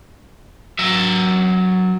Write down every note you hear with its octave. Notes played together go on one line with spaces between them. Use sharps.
F#3 E5